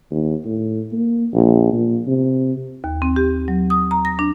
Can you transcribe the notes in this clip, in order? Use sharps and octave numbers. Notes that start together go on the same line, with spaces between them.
D#2
A2
A#3
A#1
A#2
C3
D#2
C4
G4
F#3
D#6
A#5
A#6
D4